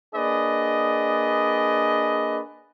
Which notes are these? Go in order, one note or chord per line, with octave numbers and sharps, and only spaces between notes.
A#3 D4 G#4 B4 D5 D#5